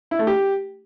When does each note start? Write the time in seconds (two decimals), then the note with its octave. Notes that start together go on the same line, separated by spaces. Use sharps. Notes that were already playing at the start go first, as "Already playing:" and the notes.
0.11 E4
0.19 A3
0.27 G4